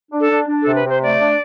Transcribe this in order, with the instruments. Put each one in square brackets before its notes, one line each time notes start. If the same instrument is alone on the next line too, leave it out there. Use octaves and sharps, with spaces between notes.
[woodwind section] D4
[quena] A4
[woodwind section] D4
D4
[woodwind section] C3 [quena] A4
[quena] B4
[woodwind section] C3 [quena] C5
[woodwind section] A3 [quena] D5
[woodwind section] D4